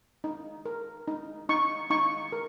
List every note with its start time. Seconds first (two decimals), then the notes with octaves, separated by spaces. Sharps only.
0.24 D#4
0.65 A#4
1.08 D#4
1.49 D#4 C#6
1.90 D#4 C#6
2.32 A#4